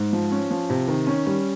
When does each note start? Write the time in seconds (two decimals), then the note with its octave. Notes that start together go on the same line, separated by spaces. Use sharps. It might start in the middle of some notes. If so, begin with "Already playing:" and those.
Already playing: G#2
0.13 F3
0.31 C#4
0.51 F3
0.70 C3
0.88 D#3
1.07 C#4
1.26 G3